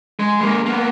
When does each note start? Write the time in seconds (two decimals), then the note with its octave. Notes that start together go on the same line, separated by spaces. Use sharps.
0.20 G#3
0.41 G#3 A#3
0.66 A#3 B3